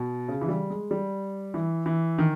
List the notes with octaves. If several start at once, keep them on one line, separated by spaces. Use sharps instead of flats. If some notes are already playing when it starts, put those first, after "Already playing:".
Already playing: B2
C#3
E3
G3
G#3
G3
E3
E3
D#3